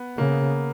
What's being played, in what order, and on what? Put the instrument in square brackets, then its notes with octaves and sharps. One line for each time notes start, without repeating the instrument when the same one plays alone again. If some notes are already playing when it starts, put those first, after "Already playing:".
Already playing: [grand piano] B3
[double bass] C#3 [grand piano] A#3